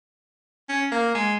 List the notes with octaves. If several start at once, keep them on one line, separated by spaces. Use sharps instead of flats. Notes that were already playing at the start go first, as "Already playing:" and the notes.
C#4
A#3
G#3